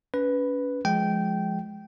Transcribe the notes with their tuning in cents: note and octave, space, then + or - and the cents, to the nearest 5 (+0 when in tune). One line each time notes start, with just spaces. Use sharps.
C#4 +30 B4 +0
F3 +0 G#3 +10 G5 -15